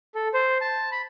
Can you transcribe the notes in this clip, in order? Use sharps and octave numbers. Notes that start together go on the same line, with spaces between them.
A4
C5
A5
B5